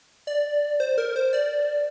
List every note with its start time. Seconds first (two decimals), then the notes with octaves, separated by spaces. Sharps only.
0.27 D5
0.80 C5
0.98 A#4
1.16 C5
1.33 D5